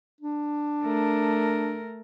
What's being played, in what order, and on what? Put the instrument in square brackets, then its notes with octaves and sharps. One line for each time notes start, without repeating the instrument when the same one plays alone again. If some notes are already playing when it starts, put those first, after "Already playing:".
[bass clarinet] D4
[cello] A3 A#4